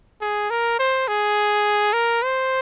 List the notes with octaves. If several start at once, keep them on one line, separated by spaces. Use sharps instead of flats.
G#4
A#4
C5
G#4
A#4
C5